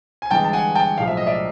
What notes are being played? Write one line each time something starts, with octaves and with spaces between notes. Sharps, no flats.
G#5
G1 G2 E3 G#3 G5 A5
A5
F#5 G#5
G5 A5
B1 A2 F3 G#3 F5
E5
D#5
D5 E5